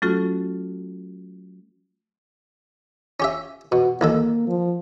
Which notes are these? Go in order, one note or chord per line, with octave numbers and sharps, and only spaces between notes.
F#3 A3 C#4 F4 F#4 A4
C#4 G4 E5
B2 F#4
C2 D#3 A#3 A4
F3